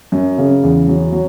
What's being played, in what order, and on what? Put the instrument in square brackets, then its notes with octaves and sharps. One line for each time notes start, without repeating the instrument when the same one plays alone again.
[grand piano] F#2
C#3
E2
F#3
F#3